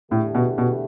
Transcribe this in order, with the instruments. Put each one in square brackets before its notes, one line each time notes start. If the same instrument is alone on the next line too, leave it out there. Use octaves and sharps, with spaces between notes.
[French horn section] E2 D3 A3 E4 G4 [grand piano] A2
[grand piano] B2
B2